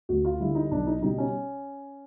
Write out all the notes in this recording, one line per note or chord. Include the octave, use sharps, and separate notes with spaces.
D2 F#4
F4
D3 G3 E4
D#4
B1 D4
D#4
B2 G3 D#4
C#4